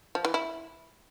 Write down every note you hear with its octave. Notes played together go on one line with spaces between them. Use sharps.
F3
E3
E4